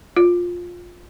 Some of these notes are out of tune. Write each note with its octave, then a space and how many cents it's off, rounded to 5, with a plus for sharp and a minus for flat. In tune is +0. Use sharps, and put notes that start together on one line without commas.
F4 +10